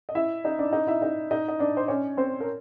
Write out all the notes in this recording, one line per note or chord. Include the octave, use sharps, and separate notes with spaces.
D#5
E4 E5
D#4 D#5
D4 D5
D#4 D#5
E4 E5
D#4 D#5
D#4 D#5
D#5
D4 D5
C5
C#4 C#5
C4 C5
A#4